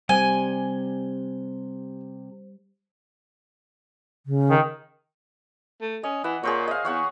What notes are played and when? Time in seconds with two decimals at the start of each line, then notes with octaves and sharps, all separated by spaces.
0.09 C3 G3 C5 G#5 G7
4.26 C#3
4.50 D#3
5.82 A3
6.03 C#4 D#5
6.24 E3 F#5
6.43 A#2 G#4 C5 C#5
6.68 D#5 F5
6.85 E2 C#5 F#5 C#6